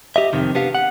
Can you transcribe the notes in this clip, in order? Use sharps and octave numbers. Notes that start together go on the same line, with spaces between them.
G4 D#5 E5
F2 C3 D#3
B3 D4 G4 F5
F#5